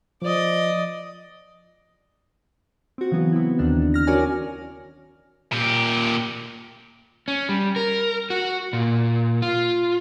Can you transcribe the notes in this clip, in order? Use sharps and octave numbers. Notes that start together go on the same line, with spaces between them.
F3 D5 D#5
C4 F#4
C#3 E3 F#3 B3
B3 C4 E4
D#2 D3 D#3 D4
F6 A#6
C#4 F#4 A#4 C#5 D5 G#5
A#2 G4
C#4
G3
A#4
F#4
A#2
F4